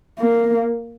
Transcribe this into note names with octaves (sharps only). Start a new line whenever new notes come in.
A#3